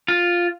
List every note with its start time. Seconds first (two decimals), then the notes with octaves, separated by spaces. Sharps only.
0.08 F4